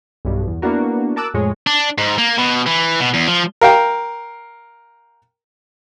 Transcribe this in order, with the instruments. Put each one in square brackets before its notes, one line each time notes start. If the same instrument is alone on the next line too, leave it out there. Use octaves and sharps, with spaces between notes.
[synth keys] B1 G2 B2
E2
A#3 B3 D4 E4 F#4 A#4
A#4 A5 D6 E6 F#6
F2 A2 G#3 C#5
[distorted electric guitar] D4
G#2
A#3
B2
E3
B2
E2
F3
[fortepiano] A#4 F5 G5